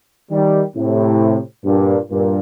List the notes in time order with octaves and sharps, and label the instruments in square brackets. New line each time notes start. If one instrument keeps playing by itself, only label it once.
[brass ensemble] D#3 G3
A2 C3
G2 A#2
G2 A#2